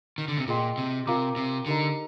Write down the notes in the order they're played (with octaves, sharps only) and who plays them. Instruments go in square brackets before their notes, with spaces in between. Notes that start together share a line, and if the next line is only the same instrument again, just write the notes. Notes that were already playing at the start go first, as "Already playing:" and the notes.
[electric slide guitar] D#3
D3
C3
[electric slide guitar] A#2 [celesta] F4 G#4 D#5 G5 C6
[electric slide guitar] C3
[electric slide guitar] C3 [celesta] F4 A#4 F5 A#5 D6
[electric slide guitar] C3
[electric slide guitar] D3 [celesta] D#4 G4 A#4 D#5 A#5